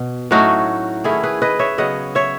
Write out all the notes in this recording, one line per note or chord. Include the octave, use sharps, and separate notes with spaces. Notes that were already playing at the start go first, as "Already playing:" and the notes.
Already playing: B2
A2 F#3 A3 C#4 D#4 F#4
D#3 A3 C#4 E4 G#4
G#4 B4
B4 D#5
C#5 E5
C#3 F#3 B3 D#5 F#5
C#5 E5